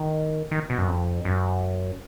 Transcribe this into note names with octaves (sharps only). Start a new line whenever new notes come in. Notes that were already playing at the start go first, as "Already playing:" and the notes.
Already playing: D#3
D#3
B2
F#2
F2
F#2